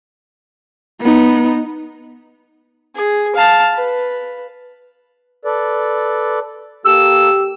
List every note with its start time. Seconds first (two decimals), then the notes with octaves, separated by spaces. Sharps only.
1.01 B3 D#4
2.95 G#4
3.36 F5 A5
3.74 B4
5.45 A4 B4 D5
6.86 A#3 G4 A4 E6